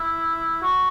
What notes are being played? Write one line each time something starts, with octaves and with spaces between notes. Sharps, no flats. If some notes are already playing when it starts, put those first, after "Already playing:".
Already playing: E4
F#4